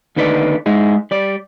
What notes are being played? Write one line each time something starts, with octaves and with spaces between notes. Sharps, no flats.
D#2 D3 D#4 B4 D5
G#3 D#4 E4 G#4
G3 D5